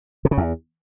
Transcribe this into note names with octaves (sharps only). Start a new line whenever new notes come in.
C3
C#3
E2